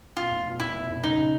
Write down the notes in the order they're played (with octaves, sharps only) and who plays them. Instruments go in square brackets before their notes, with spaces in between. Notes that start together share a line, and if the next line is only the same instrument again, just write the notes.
[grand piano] B2 [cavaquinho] F4
[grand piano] F1
B2
[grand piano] F1 [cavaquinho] E4
[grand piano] B2
F1
[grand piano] C#3 [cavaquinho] D#4
[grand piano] C#3